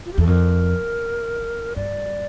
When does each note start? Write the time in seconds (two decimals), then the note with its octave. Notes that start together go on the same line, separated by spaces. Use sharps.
0.06 F4
0.13 G4
0.18 E2 A4
0.27 F2 A#4
1.76 G2 D5